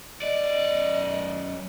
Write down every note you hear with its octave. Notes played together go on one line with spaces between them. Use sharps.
F#2 D5 D#5